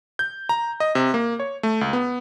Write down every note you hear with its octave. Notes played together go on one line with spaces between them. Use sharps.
G6
A#5
D#5
C3
A#3
C#5
A3
C#2
B3